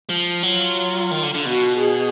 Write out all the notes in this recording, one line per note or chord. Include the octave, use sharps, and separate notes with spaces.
F3
F#3 F4
D#3
D3
D3
B2 F#4
G#4